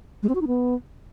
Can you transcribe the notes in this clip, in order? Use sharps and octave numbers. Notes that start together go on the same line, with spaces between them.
G#3
C4
F#4
D#4
B3